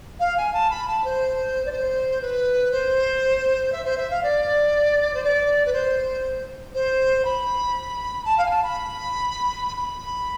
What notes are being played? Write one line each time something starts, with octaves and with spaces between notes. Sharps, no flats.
F5
G#5
A5
B5
A5
C5
D5
C5
B4
C5
E5
C5
E5
F5
D5
C5
D5
B4
C5
C5
B5
A5
F5
G#5
A5
B5
B5